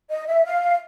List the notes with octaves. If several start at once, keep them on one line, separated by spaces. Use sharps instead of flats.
D#5
E5
F5